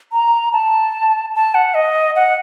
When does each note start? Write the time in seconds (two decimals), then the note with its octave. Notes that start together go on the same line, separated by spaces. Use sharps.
0.12 A#5
0.53 A5
1.35 A5
1.55 F#5
1.74 D#5
2.16 F#5